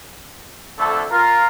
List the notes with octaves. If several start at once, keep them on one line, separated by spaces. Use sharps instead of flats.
F2 D3 A3 A4
F4 A#4